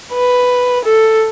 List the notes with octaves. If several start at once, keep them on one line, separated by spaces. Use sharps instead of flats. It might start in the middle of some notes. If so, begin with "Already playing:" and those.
B4
A4